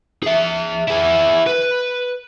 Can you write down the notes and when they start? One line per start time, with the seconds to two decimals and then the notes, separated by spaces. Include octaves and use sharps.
0.23 G#4 E5
0.88 E4 G#4
1.47 B4